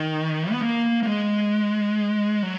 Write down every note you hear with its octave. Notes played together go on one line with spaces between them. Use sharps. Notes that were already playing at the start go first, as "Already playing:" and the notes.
Already playing: D#3
B3
A#3
A#3
G#3
F#3